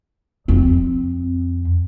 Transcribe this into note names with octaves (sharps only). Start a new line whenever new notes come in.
F2 C4